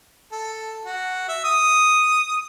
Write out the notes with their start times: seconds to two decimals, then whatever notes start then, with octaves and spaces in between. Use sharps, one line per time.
0.32 A4
0.85 F#4
1.29 E5
1.44 D#6